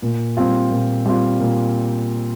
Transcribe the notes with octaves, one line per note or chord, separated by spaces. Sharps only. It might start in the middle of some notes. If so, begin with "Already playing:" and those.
A#2
G3 C4 F4
A#2
G3 C4 F4
A#2